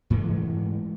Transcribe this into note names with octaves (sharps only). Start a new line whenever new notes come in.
G#2 E3 G#3 A3